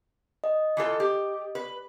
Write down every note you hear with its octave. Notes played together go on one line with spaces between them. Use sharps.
D#5
E3 F4 A4
G4
B4